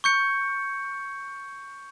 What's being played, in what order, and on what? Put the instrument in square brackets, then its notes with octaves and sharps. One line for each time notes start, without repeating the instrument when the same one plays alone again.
[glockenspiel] C#6 G6 C#7